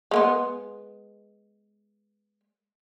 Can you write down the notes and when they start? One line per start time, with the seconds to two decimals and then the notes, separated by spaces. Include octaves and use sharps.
0.11 G#3 A#3 B3